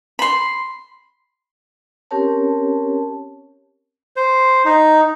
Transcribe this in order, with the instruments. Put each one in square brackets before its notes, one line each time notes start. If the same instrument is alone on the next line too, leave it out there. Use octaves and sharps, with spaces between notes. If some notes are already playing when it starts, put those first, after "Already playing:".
[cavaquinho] B5 C6
[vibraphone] C4 C#4 G4 A#4 C#5 A5
[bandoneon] C5
D#4